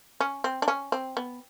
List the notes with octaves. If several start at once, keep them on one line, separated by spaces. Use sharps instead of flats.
C#4
C4
D4
C#4
C4
B3